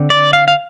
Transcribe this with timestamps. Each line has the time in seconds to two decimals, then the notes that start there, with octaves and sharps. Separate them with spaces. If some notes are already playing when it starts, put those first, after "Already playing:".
Already playing: D3 C4
0.10 D5
0.33 F5
0.48 F5